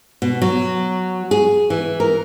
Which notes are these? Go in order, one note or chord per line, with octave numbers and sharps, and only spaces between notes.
B2
F#3
G#4
E3
A#4